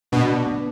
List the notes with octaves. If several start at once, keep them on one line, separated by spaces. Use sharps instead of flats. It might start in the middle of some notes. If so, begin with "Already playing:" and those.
B2 D4
B3